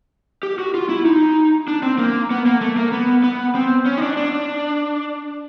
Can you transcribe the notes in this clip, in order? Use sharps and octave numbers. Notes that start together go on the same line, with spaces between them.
G4
F#4
F4
E4
D#4
D4
C4
A#3
B3
A#3
A3
A#3
B3
B3
C4
C#4
D#4
D4
D4